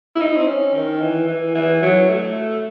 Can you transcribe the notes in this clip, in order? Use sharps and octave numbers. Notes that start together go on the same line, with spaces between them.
E4
D#4
C4
C#4
D#3
E3
E3
E3
F#3
A3